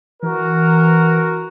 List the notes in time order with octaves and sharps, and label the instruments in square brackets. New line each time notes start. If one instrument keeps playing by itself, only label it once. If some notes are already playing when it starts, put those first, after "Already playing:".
[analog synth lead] E3 [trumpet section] F#4 A#4